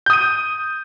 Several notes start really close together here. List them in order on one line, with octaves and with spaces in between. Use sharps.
G6 D#6 D#7